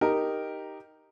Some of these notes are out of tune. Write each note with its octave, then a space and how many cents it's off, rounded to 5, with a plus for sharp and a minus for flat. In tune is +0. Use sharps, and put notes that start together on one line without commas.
D#4 +0 G4 +0 A#4 +0